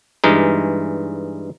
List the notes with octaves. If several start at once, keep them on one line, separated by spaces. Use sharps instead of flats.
G2 E3 G#3 D#4